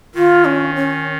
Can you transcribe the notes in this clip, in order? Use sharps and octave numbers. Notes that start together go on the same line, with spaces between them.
D#3 F4
C#4
C#4